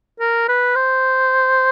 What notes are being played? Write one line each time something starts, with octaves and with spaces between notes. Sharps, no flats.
A#4
B4
C5